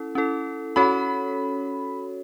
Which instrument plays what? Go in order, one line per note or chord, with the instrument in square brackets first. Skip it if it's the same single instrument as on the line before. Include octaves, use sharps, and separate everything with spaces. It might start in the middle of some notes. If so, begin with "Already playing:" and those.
Already playing: [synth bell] C#4 E4 A4
C#4 E4 A4
[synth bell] C#4 F#4 A4 C#5 [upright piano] B5